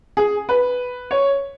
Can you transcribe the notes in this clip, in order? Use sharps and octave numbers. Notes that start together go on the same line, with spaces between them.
G#4
B4
C#5